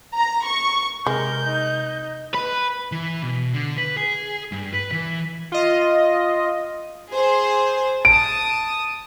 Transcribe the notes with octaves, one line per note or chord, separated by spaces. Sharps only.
A#5
C#6
C3 G#3 A#4 G6
D#4
B4
E3
B2
D3
B4
G#4
G2
B4
E3
F4 D#5
G#4 C5
A5 D#6 D7